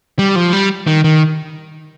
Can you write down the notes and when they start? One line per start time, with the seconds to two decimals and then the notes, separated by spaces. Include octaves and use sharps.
0.19 G3
0.36 F3
0.53 G3
0.87 D#3
1.04 D#3